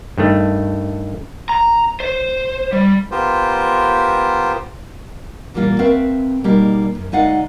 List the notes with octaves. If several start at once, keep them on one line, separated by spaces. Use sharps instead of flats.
G2 D#3 A3
A#5
C5
G3
B3 F4 G4 A#4 C5
A#2 E3 G3 A#3 F4
A3 C4 A#4 B4 E5 F5
B2 G3 A#3 D#4 G4
F#2
D2 G#3 D#4 D5 F5 F#5